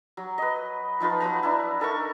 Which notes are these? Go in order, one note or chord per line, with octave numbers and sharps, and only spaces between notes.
F#3
B4 D#5
F3 D#4 F4 B4
F#3 B3 B4 A#5
D4 E4
D#4 A4 A#4 C#6